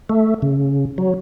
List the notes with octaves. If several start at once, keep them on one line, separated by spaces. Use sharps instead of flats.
A3
C#3
F#3